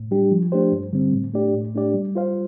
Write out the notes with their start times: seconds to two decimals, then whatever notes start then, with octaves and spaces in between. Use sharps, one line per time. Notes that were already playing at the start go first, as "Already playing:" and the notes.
Already playing: A2
0.11 G3 D4 G4
0.31 F3
0.52 A3 D4 G4 C5
0.72 G2
0.93 D3 G3 C4
1.13 A2
1.34 A3 D4 G4 D5
1.54 A2
1.74 A3 D4 G4 D5
1.94 G3
2.15 F4 C5 F5